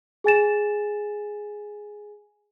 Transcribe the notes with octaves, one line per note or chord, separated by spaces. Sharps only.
G#4 G#5 A6 E7